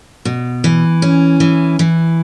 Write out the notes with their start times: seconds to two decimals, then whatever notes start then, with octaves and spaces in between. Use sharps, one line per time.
0.25 B2
0.64 E3
1.02 C#4
1.40 E3
1.79 E3